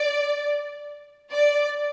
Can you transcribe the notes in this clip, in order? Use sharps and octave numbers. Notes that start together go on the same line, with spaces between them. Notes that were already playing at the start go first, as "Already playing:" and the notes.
Already playing: D5
D5